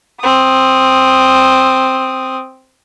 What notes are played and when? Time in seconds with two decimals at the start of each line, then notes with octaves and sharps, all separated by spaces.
0.21 C4 D#6